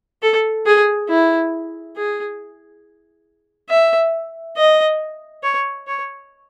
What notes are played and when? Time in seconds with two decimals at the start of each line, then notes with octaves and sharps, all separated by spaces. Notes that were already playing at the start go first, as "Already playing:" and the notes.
0.22 A4
0.66 G#4
1.09 E4
1.96 G#4
3.69 E5
4.57 D#5
5.43 C#5
5.87 C#5